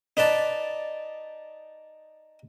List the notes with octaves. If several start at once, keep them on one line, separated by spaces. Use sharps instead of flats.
D#4 B4 D5 A5